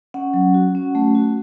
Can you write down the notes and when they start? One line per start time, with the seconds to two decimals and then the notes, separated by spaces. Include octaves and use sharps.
0.14 C#4 F#5
0.34 F#3
0.54 F#4
0.75 C#4
0.95 A3
1.15 F#4